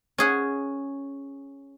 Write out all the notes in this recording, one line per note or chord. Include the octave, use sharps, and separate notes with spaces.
C#4 G#4 F#5